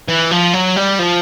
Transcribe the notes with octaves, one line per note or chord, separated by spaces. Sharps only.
E3
F3
F#3
G3
F3